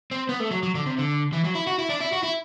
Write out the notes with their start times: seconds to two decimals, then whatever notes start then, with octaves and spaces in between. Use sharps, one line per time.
0.11 C4
0.29 B3
0.40 A3
0.51 F#3
0.63 F#3
0.75 D3
0.86 C3
0.98 D3
1.33 E3
1.44 F#3
1.55 E4
1.67 F#4
1.79 E4
1.90 D4
2.01 E4
2.13 F#4
2.24 E4